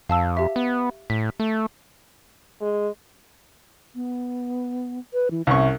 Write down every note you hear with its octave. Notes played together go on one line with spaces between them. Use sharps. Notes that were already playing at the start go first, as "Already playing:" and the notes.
F2 F5 A5 E6
G4 E5
B3
A2 B6
A3
G#3
B3
B4
E3
C2 C#4 E5 C#6